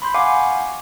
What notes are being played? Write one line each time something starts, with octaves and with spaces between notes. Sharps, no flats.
B5 C6 G6
F5 F#5 G#5 C#6 D6